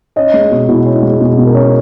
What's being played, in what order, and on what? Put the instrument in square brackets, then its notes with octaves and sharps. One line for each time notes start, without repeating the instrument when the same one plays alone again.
[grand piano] C#4 D#5
G#3
B2
B2 E4
C#4
E4
G#3
B2 G#4
B2
A#4
C#4